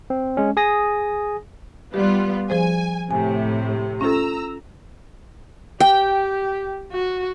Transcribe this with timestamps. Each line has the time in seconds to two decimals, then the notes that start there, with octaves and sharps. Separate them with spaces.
0.10 C4
0.37 G#3 C#4
0.57 G#4 G#5 D#6 A#6
1.94 G3 B3 F4 G4
2.50 F3 G#4 C5 G#5
3.11 A2 C3 G#5
4.01 C#4 F4 A4 A#5 E6
5.80 G4 G5
6.93 F#4